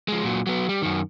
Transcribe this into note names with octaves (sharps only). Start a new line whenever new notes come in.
F3 G#3
A#2 F#3
F#3 B3
G3
F#2 D#3